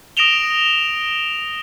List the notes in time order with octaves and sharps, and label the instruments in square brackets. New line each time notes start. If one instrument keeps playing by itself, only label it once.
[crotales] D#6 A#6 D7 E7 F7 G7